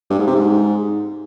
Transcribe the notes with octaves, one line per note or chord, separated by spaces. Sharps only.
G2
G#2
C3
G#2